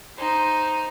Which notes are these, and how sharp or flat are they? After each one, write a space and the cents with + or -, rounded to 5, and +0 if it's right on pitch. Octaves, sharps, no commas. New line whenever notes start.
D#4 +0 C5 +0